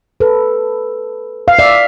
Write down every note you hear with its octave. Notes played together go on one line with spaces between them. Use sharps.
A4 B4
F5
D5 E5